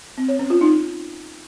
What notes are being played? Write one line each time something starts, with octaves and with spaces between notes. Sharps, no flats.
C4
C#5
C#4
F4
D#4